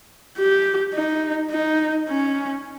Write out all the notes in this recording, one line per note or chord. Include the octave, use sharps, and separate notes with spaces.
G4
D#4
D#4
C#4